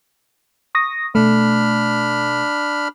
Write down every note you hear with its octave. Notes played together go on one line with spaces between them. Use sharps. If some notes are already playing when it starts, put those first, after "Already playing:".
C#6 D#6 A#6
B2 A3 D4 B5 F6